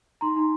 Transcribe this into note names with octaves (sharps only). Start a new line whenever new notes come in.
D#4 A#5 C6
D#4